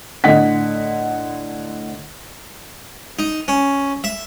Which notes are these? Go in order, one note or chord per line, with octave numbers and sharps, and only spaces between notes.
A2 D3 D#5 F#5 B6
D#4
C#4
E5